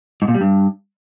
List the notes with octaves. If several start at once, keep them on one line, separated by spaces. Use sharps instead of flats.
G#2
A#2
G3
G2